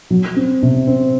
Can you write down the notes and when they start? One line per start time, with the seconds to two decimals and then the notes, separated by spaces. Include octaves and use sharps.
0.11 F#3
0.36 C4
0.63 C3
0.87 C4